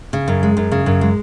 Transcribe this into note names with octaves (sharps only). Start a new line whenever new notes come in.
C#3
F#2
G#3
F#2
C#3
F#2
G#3